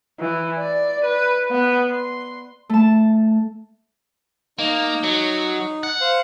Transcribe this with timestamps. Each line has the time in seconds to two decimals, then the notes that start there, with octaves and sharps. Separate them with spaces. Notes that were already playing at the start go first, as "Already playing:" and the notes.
0.20 E3
0.59 D5
1.05 B4
1.51 B3
1.91 C6
2.69 A3 A5
4.59 A#3 D#4
5.04 F#3
5.83 F#5
6.01 C5 F5